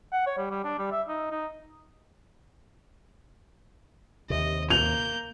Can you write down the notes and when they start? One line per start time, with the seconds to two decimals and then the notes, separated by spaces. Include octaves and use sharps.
0.12 F#5
0.27 C#5
0.38 G3
0.51 G3
0.64 D4
0.79 G3
0.92 E5
1.09 D#4
1.31 D#4
4.30 D#2 C3 D#5
4.70 A#3 G6 F7